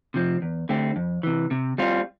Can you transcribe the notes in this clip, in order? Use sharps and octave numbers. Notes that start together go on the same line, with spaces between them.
C3 F3 C4
E2
D3 A3 C4 G4
F2
C3 E3
C3
G3 C4 F4